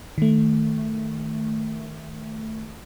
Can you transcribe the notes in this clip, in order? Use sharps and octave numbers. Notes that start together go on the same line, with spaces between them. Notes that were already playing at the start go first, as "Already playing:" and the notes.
D#3 A3